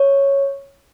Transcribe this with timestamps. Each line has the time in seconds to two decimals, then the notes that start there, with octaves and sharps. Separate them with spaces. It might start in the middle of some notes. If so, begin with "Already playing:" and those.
Already playing: C#5